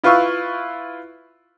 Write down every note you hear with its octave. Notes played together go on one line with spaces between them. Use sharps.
E4 F4 B4 F5 C#6 E6